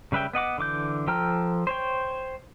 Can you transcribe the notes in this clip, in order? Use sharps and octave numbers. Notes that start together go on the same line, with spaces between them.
C#3 G3 B4 E5 G5
B3 D#5 F#5 D6
D3 E3 D6 G6
F3 A4 G5 A#5 F6
C5 C#5 G5